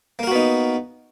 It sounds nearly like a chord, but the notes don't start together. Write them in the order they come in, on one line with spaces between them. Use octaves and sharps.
A#3 A#4 F#4 B3 D#4